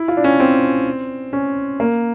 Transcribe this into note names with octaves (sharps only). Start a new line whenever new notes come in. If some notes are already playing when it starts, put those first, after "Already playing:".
Already playing: E4
F4
D4
C#4
C4
C#4
A#3